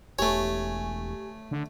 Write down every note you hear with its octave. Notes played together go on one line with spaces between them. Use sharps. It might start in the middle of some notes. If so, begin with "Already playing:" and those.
E1 A3 G4 C#5 G#5
D3